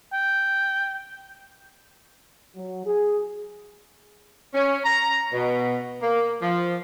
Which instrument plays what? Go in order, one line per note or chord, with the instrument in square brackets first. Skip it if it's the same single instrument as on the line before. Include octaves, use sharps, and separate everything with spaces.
[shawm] G5
[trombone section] F#3
G#4
[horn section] C#4
A#5
B2
A#3
F3